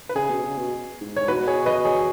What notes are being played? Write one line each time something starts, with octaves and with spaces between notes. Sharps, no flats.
B4
C#3 G#4
B2
C#3
B2
G#2
G#2 C#5
B2 F#4 B4
G#4 C#5
B4 D#5
G#4 C#5